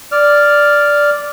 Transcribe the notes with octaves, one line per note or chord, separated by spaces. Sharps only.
D5 F6